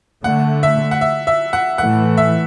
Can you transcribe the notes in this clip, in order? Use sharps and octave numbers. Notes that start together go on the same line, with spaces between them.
D3 A3 F#5
E5
F#5
E5
E5
F#5
A2 E3 A3 F#5
E5